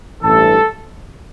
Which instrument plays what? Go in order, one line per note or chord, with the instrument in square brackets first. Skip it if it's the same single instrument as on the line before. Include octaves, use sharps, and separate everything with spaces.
[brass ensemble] A1 G2 E3 A4